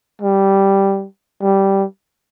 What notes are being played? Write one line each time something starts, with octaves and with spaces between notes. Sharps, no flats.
G3
G3